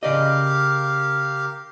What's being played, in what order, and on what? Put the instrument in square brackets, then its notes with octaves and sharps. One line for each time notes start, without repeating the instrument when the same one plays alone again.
[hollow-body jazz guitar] C#3 D5 D#5 [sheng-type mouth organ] G4 A#4 F5